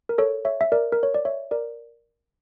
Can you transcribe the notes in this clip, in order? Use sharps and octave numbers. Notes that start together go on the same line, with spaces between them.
A#4
A4 C#5
C#5 E5
E5
A#4 D5
A#4
C#5
D5
C#5 E5
A#4 D5